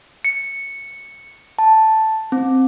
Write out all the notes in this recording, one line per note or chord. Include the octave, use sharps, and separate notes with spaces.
C#7
A5
C4